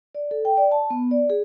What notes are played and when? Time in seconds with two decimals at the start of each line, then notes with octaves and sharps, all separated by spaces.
0.15 D5
0.31 A4
0.45 G5
0.57 D5
0.71 A5
0.90 B3
1.11 D5
1.30 G#4